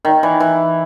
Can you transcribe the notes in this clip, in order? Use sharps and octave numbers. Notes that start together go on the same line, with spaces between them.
D#3
E3
E3